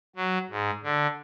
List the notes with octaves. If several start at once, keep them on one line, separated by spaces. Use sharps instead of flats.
F#3
G#2
D3